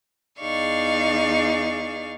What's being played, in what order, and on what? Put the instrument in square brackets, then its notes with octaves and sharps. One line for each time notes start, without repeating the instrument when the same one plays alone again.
[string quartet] E2 D#4 G#4 D5 F5 C#6